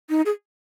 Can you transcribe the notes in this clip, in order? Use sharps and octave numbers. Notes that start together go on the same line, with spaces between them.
D#4
G#4